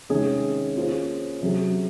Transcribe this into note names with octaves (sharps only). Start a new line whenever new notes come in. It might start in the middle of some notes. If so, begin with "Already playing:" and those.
C3 D#3 G#3 C#4 G#4
A#3 C#4 F4 G#4 C5
C3 F#3 C#4 G#4